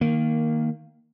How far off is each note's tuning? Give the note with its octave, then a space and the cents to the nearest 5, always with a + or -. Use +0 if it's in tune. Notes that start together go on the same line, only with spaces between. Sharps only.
D#3 +0 A#3 -5